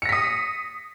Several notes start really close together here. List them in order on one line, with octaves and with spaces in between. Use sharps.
C#7 A#6 B6 D#6